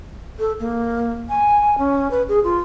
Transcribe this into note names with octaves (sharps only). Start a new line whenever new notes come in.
A4
A#3
G#5
C#4
B4
G#4
F4